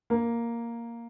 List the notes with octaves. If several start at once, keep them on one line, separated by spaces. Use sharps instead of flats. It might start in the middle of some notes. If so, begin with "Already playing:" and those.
A#3